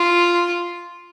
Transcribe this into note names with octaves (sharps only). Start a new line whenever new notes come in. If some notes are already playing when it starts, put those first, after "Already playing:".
Already playing: F4